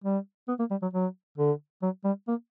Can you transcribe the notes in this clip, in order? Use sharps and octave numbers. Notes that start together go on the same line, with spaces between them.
G3
B3
A#3
G3
F#3
F#3
D3
F#3
G3
A#3